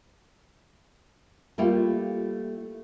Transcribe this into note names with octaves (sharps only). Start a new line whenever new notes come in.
G3 A3 A#3 E4 F4 G4